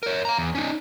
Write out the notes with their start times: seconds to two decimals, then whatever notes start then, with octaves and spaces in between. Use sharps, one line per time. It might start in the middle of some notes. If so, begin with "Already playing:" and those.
0.03 A#4 C#5
0.25 F5 A#5
0.38 E2
0.55 C#4 D#4